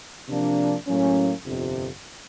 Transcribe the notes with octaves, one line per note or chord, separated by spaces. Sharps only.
C3 F3 A#3 D4
A2 F#3 A#3 C#4
G1 F2 C3